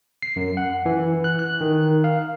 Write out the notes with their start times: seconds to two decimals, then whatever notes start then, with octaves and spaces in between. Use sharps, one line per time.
0.22 C7
0.36 F#2
0.57 F#5
0.86 E3
1.24 F#6
1.39 F#6
1.61 D#3
2.04 F5